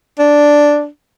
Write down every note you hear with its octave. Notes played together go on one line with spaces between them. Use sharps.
D4